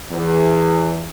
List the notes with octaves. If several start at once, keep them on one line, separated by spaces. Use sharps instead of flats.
E2